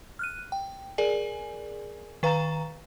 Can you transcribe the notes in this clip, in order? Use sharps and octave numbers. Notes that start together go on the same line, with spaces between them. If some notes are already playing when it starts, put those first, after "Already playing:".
F6 F#6 D#7
G5
G#4 A#4 D5 G#5
D#3 B4 F5 A#5 A6 E7